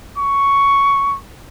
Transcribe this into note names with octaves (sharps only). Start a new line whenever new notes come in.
C#6